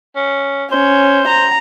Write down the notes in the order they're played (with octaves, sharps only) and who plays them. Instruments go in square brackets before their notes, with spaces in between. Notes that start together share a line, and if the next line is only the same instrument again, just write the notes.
[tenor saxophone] C#4
[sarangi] C#4 [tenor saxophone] C5
[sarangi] A#5